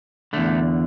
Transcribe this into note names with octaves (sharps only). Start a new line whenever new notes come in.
E2 D3 A3